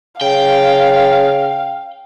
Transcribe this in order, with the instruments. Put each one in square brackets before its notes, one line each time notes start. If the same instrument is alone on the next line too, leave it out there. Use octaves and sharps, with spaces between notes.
[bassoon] C#3 [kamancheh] F5 [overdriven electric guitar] G5